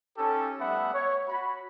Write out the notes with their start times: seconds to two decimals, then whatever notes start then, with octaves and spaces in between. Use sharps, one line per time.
0.17 C#4 D#4 G4 A4
0.60 G3 A3 B3 E5 F#5 B5
0.94 C#5
1.28 F#4 B5